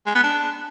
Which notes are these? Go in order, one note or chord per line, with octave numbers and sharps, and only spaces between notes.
G#3
B3
D4